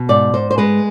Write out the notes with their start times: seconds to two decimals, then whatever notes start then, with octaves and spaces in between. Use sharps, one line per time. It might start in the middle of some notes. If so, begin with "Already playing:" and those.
Already playing: B2
0.09 G#2 D5
0.34 G#2 C5
0.51 C5
0.58 G#3 B4